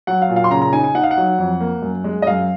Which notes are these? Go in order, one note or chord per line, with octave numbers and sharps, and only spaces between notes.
F#3 F#5
F5
A#2
F5
C6
C#3 A#5
A#5
D#4 G#5
G#5
D#4 F#5
F5
F#5
F#3
F2
A#3
F#2
G#3
D#5
F#2 F5